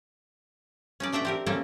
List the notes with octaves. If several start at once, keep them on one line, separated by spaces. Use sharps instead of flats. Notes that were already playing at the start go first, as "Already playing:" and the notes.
C#4 D#4 D5
A3 D4 E5 F#5 G5
C4 G4 A#4
A#3 C4 C#4 A4